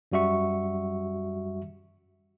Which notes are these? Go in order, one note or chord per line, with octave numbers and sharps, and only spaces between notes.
F#2 G3 F#4 E5 C#6